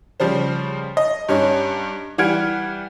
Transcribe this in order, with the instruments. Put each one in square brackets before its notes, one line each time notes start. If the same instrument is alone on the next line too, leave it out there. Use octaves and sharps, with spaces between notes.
[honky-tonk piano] C#3 F3 G3 C5
D#5
G2 C#4 D#4
E3 G3 F#5 F6 G#6 D7